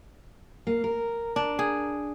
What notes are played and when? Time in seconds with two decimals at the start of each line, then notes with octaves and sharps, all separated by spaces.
0.67 A#3
0.84 A#4
1.36 D4
1.59 G#4